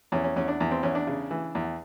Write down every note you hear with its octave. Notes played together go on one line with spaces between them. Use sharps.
E2 C#4
C#4
E2 C#4
D4
E2
C4
E2 C#4
D4
C#3
E3
E2